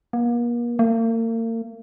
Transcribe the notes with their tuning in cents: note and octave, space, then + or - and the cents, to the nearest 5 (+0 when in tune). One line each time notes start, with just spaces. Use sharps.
A#3 +40
A#3 -40